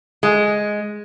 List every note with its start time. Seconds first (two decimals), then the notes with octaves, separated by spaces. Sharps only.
0.23 G#3